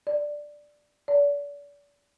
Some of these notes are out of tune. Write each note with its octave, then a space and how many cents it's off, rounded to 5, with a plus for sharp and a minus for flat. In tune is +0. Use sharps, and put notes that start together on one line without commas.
D5 +5
D5 -40